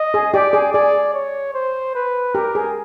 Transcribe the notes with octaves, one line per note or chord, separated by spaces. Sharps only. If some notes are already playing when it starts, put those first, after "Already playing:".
Already playing: D#5
G#4
G4 D5
G#4
G#4 D5
C#5
C5
B4
G4 A#4
G#4